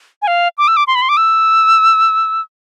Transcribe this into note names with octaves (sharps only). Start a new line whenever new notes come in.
G#5
F5
D6
E6
D6
C6
B5
C6
D6
E6